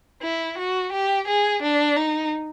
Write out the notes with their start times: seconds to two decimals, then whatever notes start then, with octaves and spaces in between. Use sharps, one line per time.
0.23 E4
0.58 F#4
0.93 G4
1.28 G#4
1.63 D4
1.96 D#4